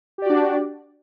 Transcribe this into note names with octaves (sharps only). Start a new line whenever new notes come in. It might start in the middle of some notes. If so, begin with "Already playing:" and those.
D4 F#4 G4 D5